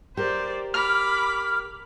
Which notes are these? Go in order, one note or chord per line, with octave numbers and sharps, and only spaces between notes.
G4 A#4 C5 D5
B5 D6 F6